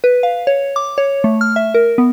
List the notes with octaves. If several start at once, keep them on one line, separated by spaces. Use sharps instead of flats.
B4
F5
C#5
D6
C#5
A3
F6
E5
A#4
B3